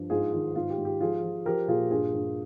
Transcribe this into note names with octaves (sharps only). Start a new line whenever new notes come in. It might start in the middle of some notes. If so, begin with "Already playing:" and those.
Already playing: G2 F3
G#2 F4 G#4
D#3 F4
G#2 F4
G4
G#2
G4
F3 F4 G#4
F3
F3 G4 A#4
A#2 F4 G#4
G2 F4 G#4
G2